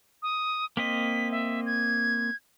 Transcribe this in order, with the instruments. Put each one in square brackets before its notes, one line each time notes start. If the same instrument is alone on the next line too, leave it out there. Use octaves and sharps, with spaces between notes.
[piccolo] D#6
[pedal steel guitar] A#3 C4 D#5 [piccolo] B6
[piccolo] E5
G#6